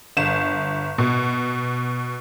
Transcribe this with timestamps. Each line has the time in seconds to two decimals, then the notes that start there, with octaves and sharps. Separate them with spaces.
0.17 G1 E7
0.98 B2